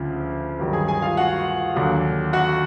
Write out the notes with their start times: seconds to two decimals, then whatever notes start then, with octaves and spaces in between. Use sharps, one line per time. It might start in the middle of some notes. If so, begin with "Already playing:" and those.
Already playing: D2 C#3 F3
0.59 G2 D#3 F#3
0.73 G#4 G#5
0.88 G#4 G#5
1.02 F4 F5
1.17 F#4 F#5
1.75 D#2 D3 F#3
2.33 F#4 F#5